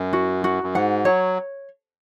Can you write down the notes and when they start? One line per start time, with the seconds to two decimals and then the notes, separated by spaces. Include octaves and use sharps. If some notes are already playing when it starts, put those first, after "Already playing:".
Already playing: F#2
0.13 F#4
0.44 F#4
0.63 F#2
0.75 G#2 F#5
1.05 F#3 C#5